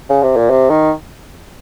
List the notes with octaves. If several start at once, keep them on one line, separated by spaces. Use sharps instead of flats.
C#3
C3
A#2
C3
D#3